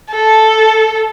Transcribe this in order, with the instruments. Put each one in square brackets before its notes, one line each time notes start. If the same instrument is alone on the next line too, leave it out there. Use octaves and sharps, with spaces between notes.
[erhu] A4